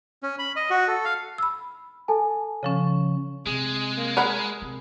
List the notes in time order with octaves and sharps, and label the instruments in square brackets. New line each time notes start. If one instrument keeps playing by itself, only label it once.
[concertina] C#4
B5
D#5
F#4
A4
F5
[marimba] B5 E6
[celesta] A4 G#5 A5
[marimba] C#3 F3 C#4
[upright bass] C3 [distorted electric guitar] G#3 [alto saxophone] G#4
[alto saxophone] A#3
[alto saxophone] G#4 [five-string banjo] A#4 F#5 B5
[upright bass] C3